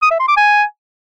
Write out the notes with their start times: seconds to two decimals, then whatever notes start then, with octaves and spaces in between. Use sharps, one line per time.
0.02 D#6
0.11 E5
0.19 C6
0.28 D6
0.37 G#5